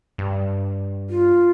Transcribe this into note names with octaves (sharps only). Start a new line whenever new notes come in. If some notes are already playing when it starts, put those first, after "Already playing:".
G2
F4